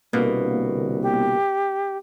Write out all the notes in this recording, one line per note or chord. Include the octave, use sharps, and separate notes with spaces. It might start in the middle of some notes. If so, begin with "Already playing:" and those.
C2 B2 D3 A#3 B3
G4